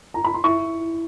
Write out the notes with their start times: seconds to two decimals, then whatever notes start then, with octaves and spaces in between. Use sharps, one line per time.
0.14 A#5
0.25 B5
0.34 C6
0.44 E4 C#6